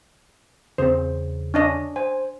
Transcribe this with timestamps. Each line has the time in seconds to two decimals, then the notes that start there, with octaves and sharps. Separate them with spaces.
0.78 E2 C#3 C4 C5
1.54 C#4 D4 D#5
1.96 C5 G#5